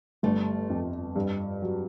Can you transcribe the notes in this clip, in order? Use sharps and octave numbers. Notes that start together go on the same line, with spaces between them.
G1 G3 A3
F2
G2
F#3